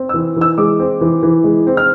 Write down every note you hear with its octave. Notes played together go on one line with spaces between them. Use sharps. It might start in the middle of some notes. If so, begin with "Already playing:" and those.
Already playing: C4
E3 E6
E3
E6
G#3 D6
C4
E3
E3
G#3
C4
F6